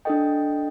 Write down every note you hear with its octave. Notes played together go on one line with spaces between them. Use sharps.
D4 A4 D#5 G5